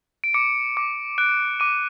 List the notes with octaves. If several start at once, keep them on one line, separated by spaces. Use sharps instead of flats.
D7
D6 C#7
D6
F#6 D7
D6 D#7